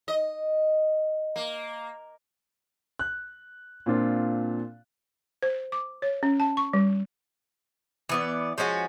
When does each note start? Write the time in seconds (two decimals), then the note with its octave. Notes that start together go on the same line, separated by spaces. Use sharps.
0.08 D#5
1.36 A#3
2.99 F#6
3.86 A#2 C4 D4 F4
5.43 C5
5.72 D6
6.02 C#5
6.23 C#4
6.40 A5
6.57 C#6
6.73 G3
8.09 E3 B3 D5
8.58 F3 G#3 C#4 F#4